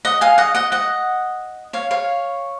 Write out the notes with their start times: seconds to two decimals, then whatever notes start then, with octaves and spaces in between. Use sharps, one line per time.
0.05 D#5 F#5
0.21 F5 G#5
0.38 D#5 F#5
0.55 D#5 F#5
0.72 D#5 F#5
1.73 C#5 F5
1.91 C#5 F5